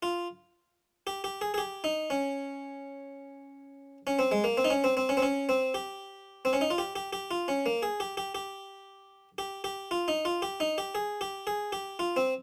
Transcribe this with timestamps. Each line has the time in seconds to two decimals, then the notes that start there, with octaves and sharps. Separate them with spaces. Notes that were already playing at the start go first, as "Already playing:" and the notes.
0.03 F4
1.07 G4
1.24 G4
1.41 G#4
1.54 G#4
1.58 G4
1.84 D#4
2.10 C#4
4.07 C#4
4.19 C4
4.32 G#3
4.44 A#3
4.57 C4
4.64 D#4
4.70 C#4
4.84 C4
4.97 C4
5.09 C#4
5.17 C4
5.22 C#4
5.49 C4
5.74 G4
6.45 C4
6.53 C#4
6.61 D#4
6.70 F4
6.78 G4
6.96 G4
7.13 G4
7.31 F4
7.48 C#4
7.66 A#3
7.83 G#4
8.00 G4
8.17 G4
8.35 G4
9.38 G4
9.64 G4
9.91 F4
10.08 D#4
10.25 F4
10.42 G4
10.60 D#4
10.78 G4
10.95 G#4
11.21 G4
11.47 G#4
11.72 G4
11.99 F4
12.16 C4